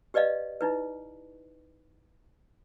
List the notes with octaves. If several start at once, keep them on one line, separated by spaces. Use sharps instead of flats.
G4 B4 D5 D#5 F5
D#4 E4 B4